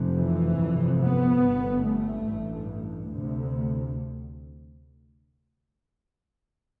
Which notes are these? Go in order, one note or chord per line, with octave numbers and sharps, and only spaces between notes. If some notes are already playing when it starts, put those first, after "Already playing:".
Already playing: F1 F2 C3
E3
G1 F2 C3
B3
G1 G2
A3
A1 G2
D2 C3